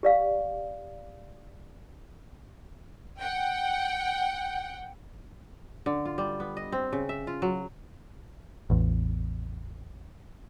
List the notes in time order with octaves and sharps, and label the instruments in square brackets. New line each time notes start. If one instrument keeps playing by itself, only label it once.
[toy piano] G4 D5 F5
[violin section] F#5 G5
[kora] D3
F4
G3
B3
D#5
C4
C#3
E5
F4
F#3
[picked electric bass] A1 E2